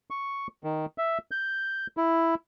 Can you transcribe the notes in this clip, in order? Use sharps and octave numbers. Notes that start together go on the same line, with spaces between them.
C#6
D#3
E5
G6
E4